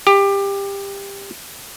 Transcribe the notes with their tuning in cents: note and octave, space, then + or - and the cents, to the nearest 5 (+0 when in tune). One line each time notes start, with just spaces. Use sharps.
G4 +20